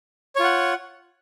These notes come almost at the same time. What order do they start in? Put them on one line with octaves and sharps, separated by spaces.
C#5 F4 F#5